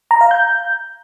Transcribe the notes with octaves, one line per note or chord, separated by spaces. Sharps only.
A#5
F5
G6